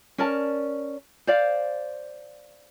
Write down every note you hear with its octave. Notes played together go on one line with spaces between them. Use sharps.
C#4 A#4 D5 A5
C5 D5 F5